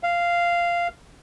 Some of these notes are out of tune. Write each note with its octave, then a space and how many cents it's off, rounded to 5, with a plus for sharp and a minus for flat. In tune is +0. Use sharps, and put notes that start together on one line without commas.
F5 -10